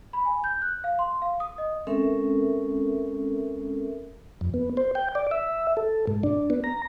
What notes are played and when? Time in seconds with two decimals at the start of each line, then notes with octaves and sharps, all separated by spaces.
0.13 B5
0.25 G#5
0.44 G6
0.62 F#6
0.84 F5
0.99 C6
1.22 F5
1.40 D#6
1.58 D#5
1.87 G#3 C4 C#4 A4 A#4 E5
4.41 F2
4.54 B3
4.77 C5
4.95 G5
5.15 D5
5.31 E5
5.77 A4
6.07 G#2
6.23 D4
6.50 B3
6.64 A#5